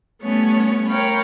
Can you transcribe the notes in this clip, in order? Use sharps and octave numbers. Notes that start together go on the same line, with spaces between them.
G3 A3 B3 C#4 C#5
A#4 C#5 F5 G5 B5